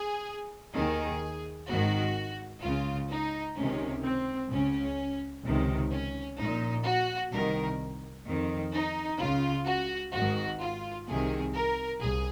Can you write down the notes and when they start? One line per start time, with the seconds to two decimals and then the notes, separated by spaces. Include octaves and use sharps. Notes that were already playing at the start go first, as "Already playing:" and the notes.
Already playing: G#4
0.75 D#2 D#3 G#4
1.69 G#1 G#2 D#3 F#4
2.63 C#2 C#3 F4
3.10 D#4
3.56 C#2 C3 D#3 C#4
4.04 C4
4.51 C#2 C#3 C#4
5.44 C#2 C3 D#3
5.91 C#4
6.38 A#1 A#2 D#4
6.85 F#4
7.32 C2 C3 D#3 A#4
8.26 F2 D#3
8.73 D#4
9.19 C#2 C#3 F4
9.66 F#4
10.13 G#1 G#2 D#3 F#4
10.60 F4
11.07 C2 C3 D#3 G#4
11.54 A#4
12.01 C2 G#4